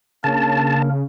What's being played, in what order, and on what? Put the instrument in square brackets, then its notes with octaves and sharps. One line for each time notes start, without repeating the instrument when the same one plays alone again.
[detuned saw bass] C#3 [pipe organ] A#3 D4 A#4 [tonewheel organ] A5